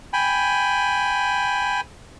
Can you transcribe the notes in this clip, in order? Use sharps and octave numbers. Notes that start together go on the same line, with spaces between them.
G5 G#5 B5